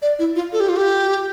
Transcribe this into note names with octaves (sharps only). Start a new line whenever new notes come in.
D5
E4
F4
A4
G4
F4
G4